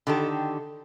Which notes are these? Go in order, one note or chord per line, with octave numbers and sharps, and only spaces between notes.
D3 D#3 G4 A4